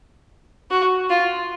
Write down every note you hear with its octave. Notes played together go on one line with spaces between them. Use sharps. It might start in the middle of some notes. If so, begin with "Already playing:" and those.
F#4
F4